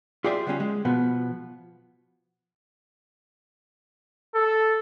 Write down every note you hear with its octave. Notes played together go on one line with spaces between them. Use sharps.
F4 G4 G#4 C5 D5 E5
D3 G3 C#4 F4
G#3
B2 F3 B3
A4